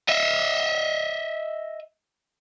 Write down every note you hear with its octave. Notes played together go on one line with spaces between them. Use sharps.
D#5 E5